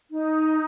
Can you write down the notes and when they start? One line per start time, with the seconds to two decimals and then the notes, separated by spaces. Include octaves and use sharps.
0.11 D#4